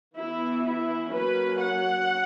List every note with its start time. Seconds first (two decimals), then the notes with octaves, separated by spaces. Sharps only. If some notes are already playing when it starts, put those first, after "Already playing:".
0.17 E3 B3 E4
0.65 E4
1.13 F#3 A#3 C#4 B4
1.61 F#5